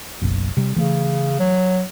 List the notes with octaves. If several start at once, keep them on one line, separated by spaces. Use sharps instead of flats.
F#1 B1 F#2
C3 G3
C#3 E3 A3
F#3